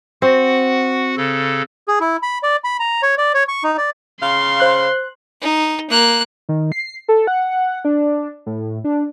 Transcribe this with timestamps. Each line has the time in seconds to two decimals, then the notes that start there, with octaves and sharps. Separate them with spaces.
0.22 C4 F#4 F#5
1.17 C#3 A4
1.88 G#4
2.01 E4
2.23 B5
2.43 D5
2.64 B5
2.80 A#5
3.03 C#5
3.18 D5
3.34 C#5
3.48 C#6
3.64 D#4
3.78 D5
4.20 C#3 F5 C6
4.60 C5 F#6
5.41 D#4
5.90 A#3 F#6
6.49 D#3
6.72 C7
7.08 A4
7.27 F#5
7.85 D4
8.46 A2
8.84 D4